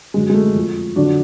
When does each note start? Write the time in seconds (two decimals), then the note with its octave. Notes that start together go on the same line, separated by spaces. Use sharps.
0.14 F#2 D3 F#3 G#3
0.30 G#3
0.34 A3
0.55 F2 F3
0.96 F2 D3 F#3 D4 F#4